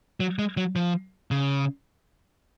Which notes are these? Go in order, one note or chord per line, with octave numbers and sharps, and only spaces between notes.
F#3
G#3
F#3
F3
C#3